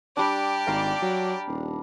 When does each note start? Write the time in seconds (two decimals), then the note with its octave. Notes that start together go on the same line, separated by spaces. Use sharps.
0.17 G3 D4 G4 D5
0.67 G#1 F5 A#5
1.02 F#3
1.47 D#1